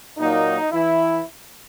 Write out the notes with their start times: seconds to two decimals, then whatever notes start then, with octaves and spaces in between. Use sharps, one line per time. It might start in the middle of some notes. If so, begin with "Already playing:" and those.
0.18 A#2 F#3 A#3 D#4
0.71 E3 E4